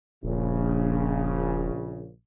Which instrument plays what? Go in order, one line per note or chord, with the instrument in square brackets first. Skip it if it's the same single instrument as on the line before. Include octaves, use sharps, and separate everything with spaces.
[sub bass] D#1 [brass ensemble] A#1 C#3